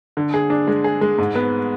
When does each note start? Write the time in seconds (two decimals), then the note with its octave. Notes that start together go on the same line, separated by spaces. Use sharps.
0.17 D3
0.34 G#4
0.50 D4
0.67 G#3
0.84 G#4
1.01 G#3
1.18 G#2
1.35 B3